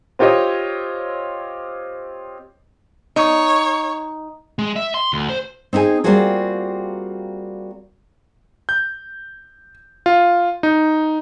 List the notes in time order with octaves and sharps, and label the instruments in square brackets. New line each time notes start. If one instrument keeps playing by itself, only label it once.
[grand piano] C4 F4 G4 C#5 D#5
[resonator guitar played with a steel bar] D#4 [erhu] C#5
[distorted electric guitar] G#3
E5
C6
D2
C5
[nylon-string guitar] C4 D#4 E4 G#4 G#5
G3 A#3 C4 F4 F#4 G#4
[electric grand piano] G6
F4
D#4